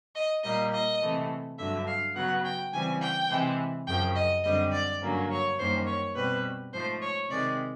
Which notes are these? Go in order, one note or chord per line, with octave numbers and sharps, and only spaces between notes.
D#5
A#2 G3 A#3 D#5
D#5
C3 E3 A3
G2 D3 F#3 E5
F5
C#3 F#3 B3 F#5
G5
C#3 E3 G3 C4 G#5
G5
C3 E3 G#3
F#2 C#3 F3 G5
D#5
F#2 D3 G3 C4 D#5
D5
G2 D3 F#3 A#3 C#4
C#5
F#2 D#3 G3 A#3 C#4 C5
C#5
B2 G3 C4 B4
G#2 F3 A3 C5
C#5
C3 D#3 G#3 D5